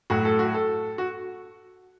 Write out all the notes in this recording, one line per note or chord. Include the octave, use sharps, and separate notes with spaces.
A2 F#3 F#4
A4
F#4
A4
F#4